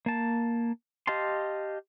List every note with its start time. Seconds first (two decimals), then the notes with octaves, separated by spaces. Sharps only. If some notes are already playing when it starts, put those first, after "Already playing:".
0.06 A#3 A5
1.07 G4 D#5 F5 A5 C6